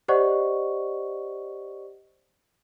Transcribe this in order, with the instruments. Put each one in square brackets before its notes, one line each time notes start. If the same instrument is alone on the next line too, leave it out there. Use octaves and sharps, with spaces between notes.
[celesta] G4 C5 D5 D#5 F#5 C#6